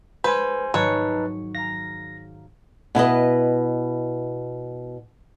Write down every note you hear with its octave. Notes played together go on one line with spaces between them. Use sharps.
G#3 B4 C5 G#5
G#2 D#3 F#3 D#4 B4 C#5 A5
F5 A#5 A#6
B2 E4 B4 D#5